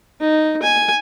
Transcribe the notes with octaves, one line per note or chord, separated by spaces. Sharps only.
D#4
G#5